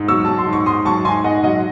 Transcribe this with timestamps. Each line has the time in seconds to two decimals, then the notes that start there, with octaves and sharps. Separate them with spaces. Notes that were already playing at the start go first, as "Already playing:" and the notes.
Already playing: G#2
0.08 F#3 C#6 E6
0.25 F#3 A5
0.38 C6
0.47 G#2
0.53 C#6
0.66 G#2 C6 D#6
0.85 F#3 A5 C#6
1.05 G#2 G#5 C6
1.24 G#2 D#5 F#5
1.43 F#3 D#5 F#5